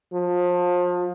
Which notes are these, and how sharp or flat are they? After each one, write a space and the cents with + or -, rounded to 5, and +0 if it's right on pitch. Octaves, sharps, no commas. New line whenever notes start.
F3 +30